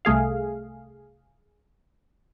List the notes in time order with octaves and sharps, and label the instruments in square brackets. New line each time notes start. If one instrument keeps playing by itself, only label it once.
[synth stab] C2 A3 G#4 F5